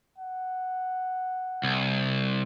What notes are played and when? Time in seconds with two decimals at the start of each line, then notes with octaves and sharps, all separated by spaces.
0.18 F#5
1.63 C2